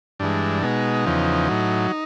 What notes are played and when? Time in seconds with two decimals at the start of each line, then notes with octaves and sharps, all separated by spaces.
0.19 G2 E3 G#3 D4
0.63 B2 G#3 D#4
1.06 E2 C#3 F3
1.49 A2 F#3